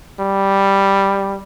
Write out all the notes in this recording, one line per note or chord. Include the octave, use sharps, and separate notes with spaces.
G3